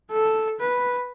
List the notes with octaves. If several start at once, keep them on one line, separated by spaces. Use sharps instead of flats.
A4
B4